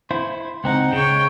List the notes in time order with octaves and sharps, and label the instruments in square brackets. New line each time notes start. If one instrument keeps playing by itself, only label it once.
[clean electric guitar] E4 C5
[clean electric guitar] C#2 C4 D#4 [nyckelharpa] F#5
[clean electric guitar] C#3 [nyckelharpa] C#5 G5